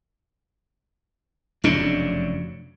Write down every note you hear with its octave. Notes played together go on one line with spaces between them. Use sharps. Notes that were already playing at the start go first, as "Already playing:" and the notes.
F1 F#2 C#3 D4